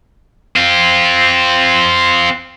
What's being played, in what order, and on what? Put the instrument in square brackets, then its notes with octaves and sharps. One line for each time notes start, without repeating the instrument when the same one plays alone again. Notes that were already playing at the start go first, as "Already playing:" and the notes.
[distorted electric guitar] C4 F4